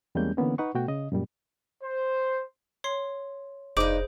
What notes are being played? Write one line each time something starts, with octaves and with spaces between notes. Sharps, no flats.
E2 G3 G#3 A#3 C#4 G6
D3 E3 A#3 B3 C#4
D#4 B4 F#5 C#6
B2 A3 F#4 G5
C#3 D#5
F#2 A#2 G3
C5
C#5 C6 C7
F1 G2 D#4 G#4 C5 D6 D#6 D7